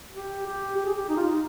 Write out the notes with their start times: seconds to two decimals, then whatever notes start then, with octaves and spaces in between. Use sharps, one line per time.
0.14 G4
0.46 G4
0.77 G4
0.85 G#4
0.95 G4
1.09 D#4
1.17 F4
1.23 D#4